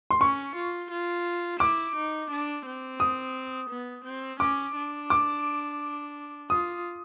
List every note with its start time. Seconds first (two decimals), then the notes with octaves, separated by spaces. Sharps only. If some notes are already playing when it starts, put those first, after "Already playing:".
0.10 C6
0.21 C#4 C#6
0.56 F4
0.91 F4
1.60 E4 D6
1.96 D#4
2.31 D4
2.66 C4
3.00 D#6
3.70 B3
4.05 C4
4.40 C#4 D6
4.76 D4
5.10 D6
6.50 F4 D#6